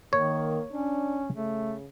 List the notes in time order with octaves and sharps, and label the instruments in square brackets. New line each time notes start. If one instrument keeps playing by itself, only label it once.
[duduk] D#3 [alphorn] A#3 [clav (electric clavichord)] C#5
[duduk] C#4 [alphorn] D4
[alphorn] C#3 [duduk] A3